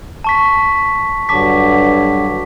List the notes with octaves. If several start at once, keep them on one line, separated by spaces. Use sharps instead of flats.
A5 C#6 B6
G2 D3 F#3 A5 D6 B6